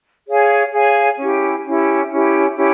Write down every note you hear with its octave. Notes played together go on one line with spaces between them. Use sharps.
G#4 C#5 F5 G#5
G#4 C#5 F5 G#5
C#4 E4 G4
C#4 E4 G4
C#4 E4 G4
C#4 E4 G4